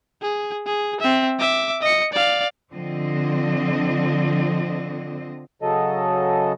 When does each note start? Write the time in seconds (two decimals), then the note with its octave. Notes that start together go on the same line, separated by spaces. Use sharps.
0.22 G#4
0.66 G#4
1.00 C4 E5
1.39 E5 D6
1.82 D#5 C#7
2.13 D5 F5
2.72 D3 F3 C4 D#5
5.62 C#3 F#3 A4 D#5